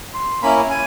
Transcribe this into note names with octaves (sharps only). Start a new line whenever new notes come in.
C6
A#3 C#4 E4 B5
G#5